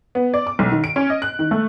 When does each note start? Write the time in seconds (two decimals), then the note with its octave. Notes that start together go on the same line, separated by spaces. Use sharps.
0.15 B3
0.34 D5
0.47 D6
0.59 B1
0.71 D#3
0.84 D7
0.96 C#4
1.10 D#5
1.22 F#6
1.39 D#3
1.51 A3